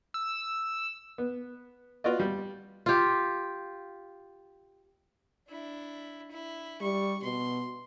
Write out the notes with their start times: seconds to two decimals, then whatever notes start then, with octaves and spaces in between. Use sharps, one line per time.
0.14 E6
1.18 B3
2.04 F4 F#4 B4 D5 D#5
2.20 G3
2.86 F4 G4
5.48 D4 E4
6.31 E4
6.81 G3 C#6
7.23 B2 C6